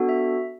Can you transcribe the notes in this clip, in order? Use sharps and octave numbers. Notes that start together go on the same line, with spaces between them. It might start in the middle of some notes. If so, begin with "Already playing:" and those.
Already playing: B3 D4 F#4 A4
E5